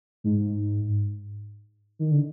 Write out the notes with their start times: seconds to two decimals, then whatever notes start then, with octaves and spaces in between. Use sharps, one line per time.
0.24 G#2
1.99 D#3
2.11 D3